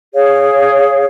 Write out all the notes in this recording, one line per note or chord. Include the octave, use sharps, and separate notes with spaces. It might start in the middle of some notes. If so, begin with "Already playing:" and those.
G#4 C#5 F5